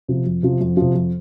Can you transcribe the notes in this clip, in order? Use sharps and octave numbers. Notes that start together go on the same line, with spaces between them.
C3 F3
F2
C3 F3
F2
C3 F3
F2